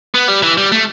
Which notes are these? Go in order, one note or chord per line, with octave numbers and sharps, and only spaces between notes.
B3
G3
E3
G3
A3